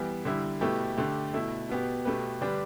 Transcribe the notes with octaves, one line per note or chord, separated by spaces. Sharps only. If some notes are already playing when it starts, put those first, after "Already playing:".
Already playing: E3 G3 B3
D3 G3 E4
B2 A3 E4 G4 B4
D3 A3 G4
B2 A3 E4
B2 B3 G4
B2 A3 G4 B4
D3 G3 D4 G4 B4